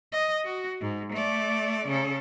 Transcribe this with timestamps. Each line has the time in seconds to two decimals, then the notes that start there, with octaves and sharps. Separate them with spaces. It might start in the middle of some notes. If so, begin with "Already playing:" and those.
0.12 D#5
0.45 F#4
0.81 G#2
1.13 A3 D5
1.88 C#3 A4